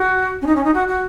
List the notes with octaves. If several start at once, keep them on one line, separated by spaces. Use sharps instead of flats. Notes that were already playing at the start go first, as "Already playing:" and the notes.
Already playing: F#4
C#4
D#4
C#4
D#4
F#4
F#4